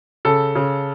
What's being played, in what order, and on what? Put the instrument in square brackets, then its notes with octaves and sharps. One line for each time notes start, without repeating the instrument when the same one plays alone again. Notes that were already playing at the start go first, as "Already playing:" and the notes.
[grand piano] C#3 A4
C#3